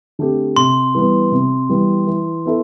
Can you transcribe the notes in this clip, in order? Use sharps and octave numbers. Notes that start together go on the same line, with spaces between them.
D3 A3 C4 G4
C3 C6
E3 G3 B3
C3
E3 G3 B3
E3
B3 E4 A4